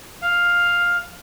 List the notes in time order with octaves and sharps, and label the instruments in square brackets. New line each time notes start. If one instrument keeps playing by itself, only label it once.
[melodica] F5